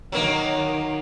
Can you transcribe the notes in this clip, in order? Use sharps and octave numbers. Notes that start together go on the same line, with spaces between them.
D#3 F#3 A#3